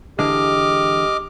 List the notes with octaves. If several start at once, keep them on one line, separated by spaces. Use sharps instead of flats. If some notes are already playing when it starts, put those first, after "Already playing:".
D3 E3 G#3 G4 D#5 D6 F6